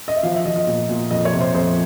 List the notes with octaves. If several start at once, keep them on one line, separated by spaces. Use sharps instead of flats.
D#5
E5
F3 F5
E5
F3 D#5
D#5
A#2
A#2
F2 D#5
C#5
C3
C5
F2 C5